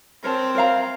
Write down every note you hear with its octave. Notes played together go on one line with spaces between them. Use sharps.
C4 A#4 C#5 A5
A#4 C#5 F5 A#5